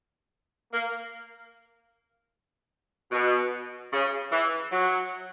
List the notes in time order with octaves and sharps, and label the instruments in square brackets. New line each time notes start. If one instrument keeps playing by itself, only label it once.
[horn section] A#3
B2
C#3
E3
F#3